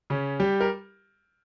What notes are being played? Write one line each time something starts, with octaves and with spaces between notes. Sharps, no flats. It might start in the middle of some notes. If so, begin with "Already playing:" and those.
C#3 C#4
G3 G4
A#4